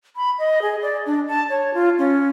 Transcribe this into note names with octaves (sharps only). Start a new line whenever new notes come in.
B5
D#5
G#4
D5
D4
A5
C#5
F4
C#4